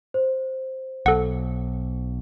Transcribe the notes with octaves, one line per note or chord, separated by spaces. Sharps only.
C5
B1 A4 F#5